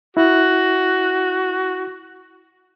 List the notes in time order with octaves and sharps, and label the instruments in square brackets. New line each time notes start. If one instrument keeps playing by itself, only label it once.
[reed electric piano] E4 [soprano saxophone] F#4